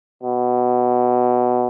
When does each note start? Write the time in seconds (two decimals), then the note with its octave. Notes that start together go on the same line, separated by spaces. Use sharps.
0.23 B2